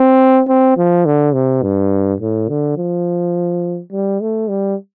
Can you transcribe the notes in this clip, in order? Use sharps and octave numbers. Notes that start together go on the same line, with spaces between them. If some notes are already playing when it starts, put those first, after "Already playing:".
Already playing: C4
C4
F3
D3
C3
G2
A2
D3
F3
G3
A3
G3